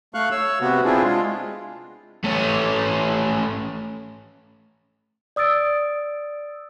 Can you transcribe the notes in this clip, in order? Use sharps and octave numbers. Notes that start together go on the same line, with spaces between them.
A3 F5 C#6 F#6
C#5 E6
C3 B3 F#4
C4 D4 E4 F4 G#4
G#3 F4
A3 C#4
D5 D#6 E6 A6 D7